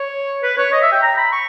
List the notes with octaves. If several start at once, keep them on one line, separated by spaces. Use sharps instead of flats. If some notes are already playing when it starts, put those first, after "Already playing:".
Already playing: C#5
B4
C#5
D#5
E5
G5
A#5
B5
C#6